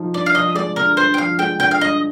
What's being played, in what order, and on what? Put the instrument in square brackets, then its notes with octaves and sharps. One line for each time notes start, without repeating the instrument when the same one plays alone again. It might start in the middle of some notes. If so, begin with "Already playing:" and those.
Already playing: [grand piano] F3 D#4
[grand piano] G2 [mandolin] D5
[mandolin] F5
[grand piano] F3 [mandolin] D#5
[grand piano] G#3 [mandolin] D5
[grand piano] D3 [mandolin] A#4
[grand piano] G2 [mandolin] C5
[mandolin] G5
[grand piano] F3 [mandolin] F5
[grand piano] G#3 [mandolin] G5
[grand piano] D3 [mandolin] G5
[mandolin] F5
[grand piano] G2 [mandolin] D#5